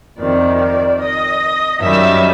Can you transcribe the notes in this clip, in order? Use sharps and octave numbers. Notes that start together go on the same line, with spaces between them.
F2 C3 D#3 D5
D#5
F#2 D#3 G3 E5